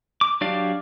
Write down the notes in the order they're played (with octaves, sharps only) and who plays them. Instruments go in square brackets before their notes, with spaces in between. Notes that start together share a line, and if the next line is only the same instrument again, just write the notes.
[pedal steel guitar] D6
F#3 D4 G4 D5 F5